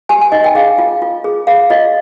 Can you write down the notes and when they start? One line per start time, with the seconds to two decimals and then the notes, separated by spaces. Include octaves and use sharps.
0.09 G4 G#5
0.21 G#5
0.32 D#4 D#5
0.44 G5
0.55 G#4 F5
0.78 F4
1.02 F4
1.24 G#4
1.47 G#4 F5
1.70 F4 D#5